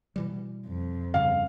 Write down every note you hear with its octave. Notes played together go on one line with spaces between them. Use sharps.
B2 E3 G3
F2
G2 C#3 G3 F5